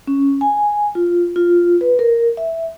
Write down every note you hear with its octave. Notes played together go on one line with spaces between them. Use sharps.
C#4
G#5
F4
F4
B4
A#4
E5